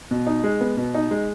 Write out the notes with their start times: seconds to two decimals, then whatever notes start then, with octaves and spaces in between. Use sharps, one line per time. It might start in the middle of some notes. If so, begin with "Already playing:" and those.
0.11 B2
0.27 D#4
0.44 G#3
0.61 B3
0.77 B2
0.94 D#4
1.11 G#3